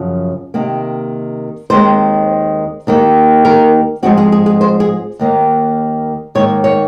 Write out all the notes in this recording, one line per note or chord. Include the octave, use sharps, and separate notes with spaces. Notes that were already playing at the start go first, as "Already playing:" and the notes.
Already playing: F#2 C#3 F3
C3 D#3 A#3
D#2 D#3 G#3 C4 C5
D#2 D#3 A#3
A#4
G#2 F3 G#3 C4 F#4
G#4
G#4
G#4
C5
G#4
D#2 D#3 A#3
G#2 D#3 A#3 C#5
C#5